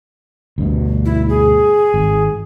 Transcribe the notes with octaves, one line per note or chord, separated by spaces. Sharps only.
D2 G2 B2
E4
G#4
G#1